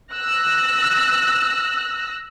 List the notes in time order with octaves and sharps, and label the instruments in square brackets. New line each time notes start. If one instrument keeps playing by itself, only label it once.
[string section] E6 F#6 A#6